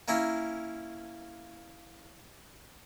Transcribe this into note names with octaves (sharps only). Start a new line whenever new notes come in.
A#3 C#4 E4 A#4